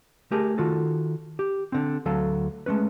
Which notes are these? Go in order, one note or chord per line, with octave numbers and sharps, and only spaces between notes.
A3 G4 G#4 A#4
D#3 F4 F#4 A4
G4
D3 C4
D2 F#3 A4 F5
G#3 A3 C#4 B4